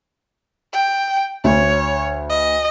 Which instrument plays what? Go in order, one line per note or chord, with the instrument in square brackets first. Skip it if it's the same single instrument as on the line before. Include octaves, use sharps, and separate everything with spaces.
[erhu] G5
[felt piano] D2 [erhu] C#5
[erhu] D#5